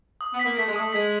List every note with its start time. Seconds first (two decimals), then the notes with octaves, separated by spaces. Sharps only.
0.21 D#6
0.33 B3
0.39 B6
0.45 A#3
0.57 A3 B6
0.67 G#3
0.76 A3 D#6
0.93 G#3 B6